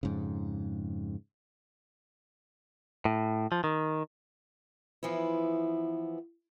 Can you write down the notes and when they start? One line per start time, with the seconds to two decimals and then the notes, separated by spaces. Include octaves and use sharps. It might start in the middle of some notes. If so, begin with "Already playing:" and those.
0.03 F2 G#2 C#3
3.05 A2
3.52 F3
3.64 D#3
5.03 E3 F3 B3 E4